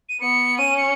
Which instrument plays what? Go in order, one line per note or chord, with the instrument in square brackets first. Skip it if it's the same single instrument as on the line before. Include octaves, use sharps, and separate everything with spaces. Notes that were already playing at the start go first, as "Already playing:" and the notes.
[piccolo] D#7
[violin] B3 [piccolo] C#7
[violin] C#4 [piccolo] D#7
[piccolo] C#7